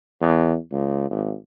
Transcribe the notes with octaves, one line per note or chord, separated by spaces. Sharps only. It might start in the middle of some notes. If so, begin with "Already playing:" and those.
E2
C#2
G#1